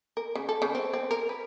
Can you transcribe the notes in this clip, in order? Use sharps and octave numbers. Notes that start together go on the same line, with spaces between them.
A#4
C#3
A4
C#3
C4
C4
A#4
B4